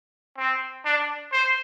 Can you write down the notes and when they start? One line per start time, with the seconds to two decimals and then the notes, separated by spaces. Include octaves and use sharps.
0.38 C4
0.85 D4
1.33 C5